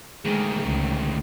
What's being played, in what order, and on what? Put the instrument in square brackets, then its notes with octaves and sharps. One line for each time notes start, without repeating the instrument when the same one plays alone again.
[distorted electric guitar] D2 D#3 [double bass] G#3
[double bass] C#2